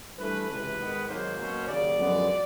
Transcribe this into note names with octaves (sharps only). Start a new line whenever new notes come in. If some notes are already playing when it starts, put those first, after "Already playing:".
G2 E3 A3 B4
C#2 C3 E3 B4
G#2 D#3 G#3 B3
G#1 G#2 D#3 F#3 A#3 C5
B2 F#3 A#3 C#4
D#2 C#3 F#3 D5
F#2 D3 F3 G#3 B3